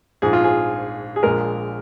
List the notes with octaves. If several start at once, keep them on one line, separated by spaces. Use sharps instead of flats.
A#1 G#2 F3 G#4
F4
G#4
G#4
A#1 A#2 G#3 A#4